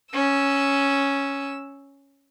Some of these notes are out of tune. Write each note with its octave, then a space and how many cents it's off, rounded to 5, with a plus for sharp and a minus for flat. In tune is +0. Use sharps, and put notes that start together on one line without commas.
C#4 +0 E6 +0